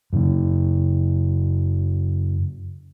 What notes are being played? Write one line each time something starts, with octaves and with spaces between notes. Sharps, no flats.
F#2 C#3